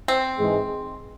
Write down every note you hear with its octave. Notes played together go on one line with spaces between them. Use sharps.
C4
G#2 E3 G#3